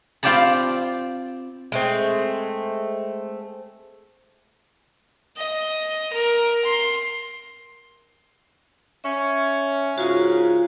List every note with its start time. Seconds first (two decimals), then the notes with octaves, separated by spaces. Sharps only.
0.23 C4 F4 G4 D5 A5 B5
1.72 G#3 A3 C4
5.37 D#5
6.12 A#4
6.65 C6
9.04 C#4 E5
9.98 G#2 C#3 F4 F#4